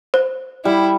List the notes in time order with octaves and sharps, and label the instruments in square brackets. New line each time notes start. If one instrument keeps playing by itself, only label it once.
[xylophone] C5
[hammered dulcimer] G3 [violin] E4